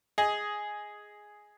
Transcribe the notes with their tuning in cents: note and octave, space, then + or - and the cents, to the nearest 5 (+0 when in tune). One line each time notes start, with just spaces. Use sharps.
G#4 +0 D#5 +5